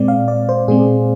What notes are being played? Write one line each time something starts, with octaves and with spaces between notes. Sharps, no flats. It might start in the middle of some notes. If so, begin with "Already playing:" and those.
Already playing: A#2 G#3 C4 D5
F5
D5
C5
A#2 G#3 C4 G#4